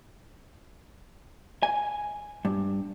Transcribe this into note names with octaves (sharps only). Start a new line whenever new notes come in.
G#5
G2